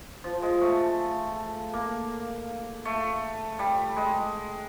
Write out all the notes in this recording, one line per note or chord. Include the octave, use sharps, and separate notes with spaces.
F3
G#3
A3
A#3
A3
G3
G#3